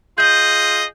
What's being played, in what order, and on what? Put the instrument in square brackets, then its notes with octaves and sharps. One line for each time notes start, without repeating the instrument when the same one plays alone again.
[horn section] F4 G#4 D#5 [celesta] G6